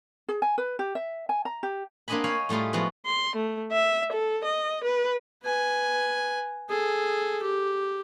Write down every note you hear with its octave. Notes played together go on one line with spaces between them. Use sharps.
G#4
G#5
B4
G4
E5
G#5
A#5
G4
A#3 C4 D4 D#5 G#5 B5
C#5 F5 G5 G#5 B5
A2 G3 A3 F4 G#4
F3 G#3 B3 E4 F#4
C6
A3
E5
A4
D#5
B4
B4 G#5
G#4 A4
G4